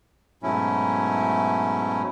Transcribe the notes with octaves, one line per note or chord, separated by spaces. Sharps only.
G#2 B2 F#3 A3 C#4 E4